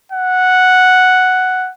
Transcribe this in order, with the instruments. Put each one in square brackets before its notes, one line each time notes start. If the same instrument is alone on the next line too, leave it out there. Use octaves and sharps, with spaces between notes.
[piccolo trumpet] F#5